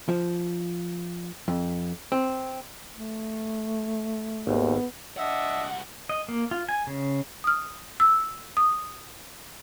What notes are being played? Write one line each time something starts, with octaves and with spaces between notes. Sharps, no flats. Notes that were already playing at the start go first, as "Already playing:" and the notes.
F3
F2
C4
A3
G#1 D#2 B3
C2 D4 D#5 E5 F#5
D#5
A#3
F4
G#5
C#3
D#6 F6
E6
D#6